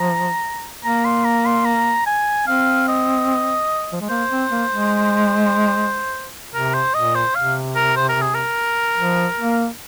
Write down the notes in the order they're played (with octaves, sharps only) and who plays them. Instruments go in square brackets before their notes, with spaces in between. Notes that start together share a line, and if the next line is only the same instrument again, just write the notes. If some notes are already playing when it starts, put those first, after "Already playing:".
Already playing: [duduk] F3 [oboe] A#5
[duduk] A#3 [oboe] A#5
[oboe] C6
A#5
C6
A#5
G#5
[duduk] C4 [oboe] F5
[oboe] D#5
[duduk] F3
G#3
[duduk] A#3 [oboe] C5
[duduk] C4
A#3
G#3
[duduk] C3 [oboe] A#4
[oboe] C5
[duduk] A#2 [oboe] D#5
[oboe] C5
[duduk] C3 [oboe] F5
[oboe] A#4
C5
A#4
G#4
A#4
[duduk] F3
A#3